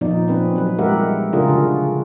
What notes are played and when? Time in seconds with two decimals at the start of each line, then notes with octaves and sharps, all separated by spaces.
0.01 A#2 F3 B3 D#4 D5
0.28 C4 C#4 B4
0.56 F#3 B4
0.78 G3 G#3 G4 A#4 E5 F#5
1.33 C#3 D4 F4 G#4 A#4
1.48 D3 F#4